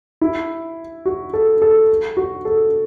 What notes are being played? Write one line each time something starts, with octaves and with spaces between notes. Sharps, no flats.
E4
F#4
A4
A4
F#4
A4